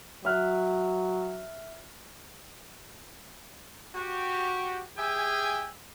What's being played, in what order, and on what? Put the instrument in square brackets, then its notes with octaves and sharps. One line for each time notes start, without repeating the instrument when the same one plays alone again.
[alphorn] F#3 [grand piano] E5 F6 F#6
[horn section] F#4 G4
G4 G#4 E5 G5 G#5